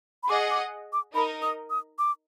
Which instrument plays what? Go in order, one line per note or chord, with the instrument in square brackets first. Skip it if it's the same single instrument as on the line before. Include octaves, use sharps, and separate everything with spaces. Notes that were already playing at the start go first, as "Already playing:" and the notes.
[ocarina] B5
[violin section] G#4 D#5 F#5 [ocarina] D6
[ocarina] D6
D6
[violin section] D#4 A#4 D#5 [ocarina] B5
[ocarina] D#6
D#6
D6